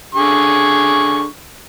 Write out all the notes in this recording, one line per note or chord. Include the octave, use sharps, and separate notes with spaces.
D3 G#4 C#6